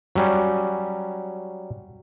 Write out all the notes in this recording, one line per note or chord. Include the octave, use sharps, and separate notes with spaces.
F#3 G3 C#4